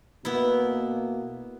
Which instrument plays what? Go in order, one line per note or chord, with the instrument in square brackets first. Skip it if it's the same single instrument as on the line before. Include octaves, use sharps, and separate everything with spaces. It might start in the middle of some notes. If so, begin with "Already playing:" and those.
[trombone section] B2 A#3 [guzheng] B3 E4